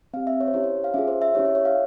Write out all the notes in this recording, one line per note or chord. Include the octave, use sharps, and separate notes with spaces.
C4 G4 F5
E5
C#5
C5
C#4 E4 G4 C#5
C5
F5
C#4 F4 G#4 E5
C5
E5
C#4 E4 G4 C#5
E5
C#5
F5